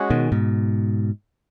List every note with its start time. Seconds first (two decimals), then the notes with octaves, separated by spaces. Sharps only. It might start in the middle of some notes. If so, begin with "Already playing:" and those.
Already playing: G#3 C#4 F#4
0.11 B2 D#3
0.32 G#2 B2